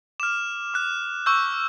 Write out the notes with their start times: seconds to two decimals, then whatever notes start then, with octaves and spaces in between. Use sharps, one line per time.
0.20 D6 F6 E7
0.74 D6 F#6
1.26 C#6 E6 G6